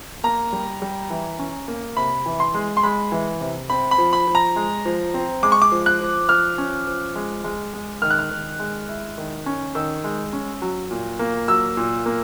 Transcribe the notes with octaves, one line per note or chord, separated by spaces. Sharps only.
A#3 A#5
G3
G3
E3
C#4
A#3
C3 B5
E3
C6
G#3
C6
G#3 B5
E3
C3
C4 B5
B5
F3
B5
F3
A#5
G#3
F3
C4
G#3 D6
C#6
D6
F3
F#6
F3
F3 F6
C#4
F3
G#3
G#3
G#3
D#3 F6
F#6
F6
D#3
G#3
E4
D#3
C#4
D#3 E6
G#3
C#4
F#3
A#2
A#3
F#3 E6
A#2
A#3